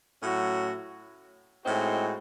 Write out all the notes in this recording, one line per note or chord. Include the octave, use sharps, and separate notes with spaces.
A2 F#3 C#4 F#4
A2 G#3 C4 D#4 F#4